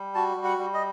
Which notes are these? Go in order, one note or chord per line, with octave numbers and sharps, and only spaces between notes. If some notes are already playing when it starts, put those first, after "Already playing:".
Already playing: G3
F#4 A5
G3
F#5
G3
D#5